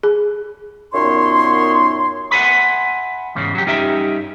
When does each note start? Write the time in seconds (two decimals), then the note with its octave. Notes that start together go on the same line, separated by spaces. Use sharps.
0.03 G#4
0.93 F#2 A#2 B3 D#4 C#5 C6
2.31 E5 F#5 G#5 B5 C6
3.35 E2 G#2 C#3
3.55 F#3 G4
3.66 G2 C#4 D#4 G4 E5